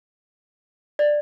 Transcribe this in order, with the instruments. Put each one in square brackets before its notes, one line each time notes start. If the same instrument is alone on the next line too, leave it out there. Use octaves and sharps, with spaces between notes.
[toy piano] D5